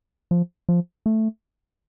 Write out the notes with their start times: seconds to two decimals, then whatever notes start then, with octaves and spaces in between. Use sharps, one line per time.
0.31 F3
0.69 F3
1.06 A3